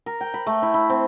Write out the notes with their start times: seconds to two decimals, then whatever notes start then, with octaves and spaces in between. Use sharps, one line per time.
0.06 A#4
0.21 G5
0.34 B5
0.47 A3
0.62 E4
0.74 E4
0.90 C4